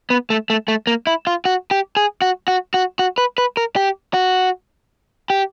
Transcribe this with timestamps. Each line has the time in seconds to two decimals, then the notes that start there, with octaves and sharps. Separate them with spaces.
0.10 B3
0.30 A3
0.50 A3
0.68 A3
0.87 A#3
1.07 E4
1.27 F4
1.45 F#4
1.71 G4
1.97 G#4
2.22 F#4
2.48 F#4
2.74 F#4
2.99 F#4
3.18 B4
3.38 B4
3.57 A#4
3.76 G4
4.14 F#4
5.30 G4